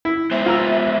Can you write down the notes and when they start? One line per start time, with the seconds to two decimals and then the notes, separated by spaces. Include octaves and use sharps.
0.05 E4
0.31 G#3 B3 C5 E5
0.46 F4 A#5 E6